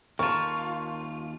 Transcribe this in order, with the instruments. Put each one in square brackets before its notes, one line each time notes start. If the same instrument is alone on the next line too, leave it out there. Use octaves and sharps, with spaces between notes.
[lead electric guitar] D#2 F4 [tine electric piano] A#4 A5 [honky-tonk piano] C#6